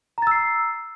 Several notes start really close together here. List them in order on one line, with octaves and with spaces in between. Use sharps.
A#5 A6 E6 C7